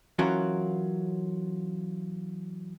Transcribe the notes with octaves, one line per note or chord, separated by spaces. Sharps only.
E3 F#3 C#4 F4 F#4 A#4